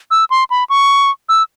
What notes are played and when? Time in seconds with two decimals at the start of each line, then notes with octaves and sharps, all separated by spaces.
0.11 E6
0.30 C6
0.50 B5
0.69 C#6
1.29 E6